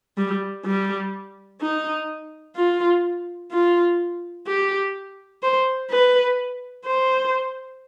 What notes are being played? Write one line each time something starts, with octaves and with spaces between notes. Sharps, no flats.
G3
G3
D#4
F4
F4
G4
C5
B4
C5